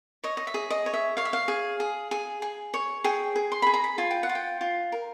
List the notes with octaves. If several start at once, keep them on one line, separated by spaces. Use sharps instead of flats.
C#5 D#5
D#5
E5
G#4
D#5
C#5
E5
C#5 F5
E5
F5
G#4
G#4
G#4
G#4
C#5
G#4 G5
G#4
C6
G#4 B5
A#5
B5
F4 G#5
G5
F#5
F4
G5
F4
A#4